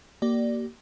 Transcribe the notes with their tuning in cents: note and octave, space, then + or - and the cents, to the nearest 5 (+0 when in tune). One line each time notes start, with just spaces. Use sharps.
A#3 +0 G4 -35 D5 +0